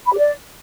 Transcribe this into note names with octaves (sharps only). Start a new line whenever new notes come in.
B5
G4
D5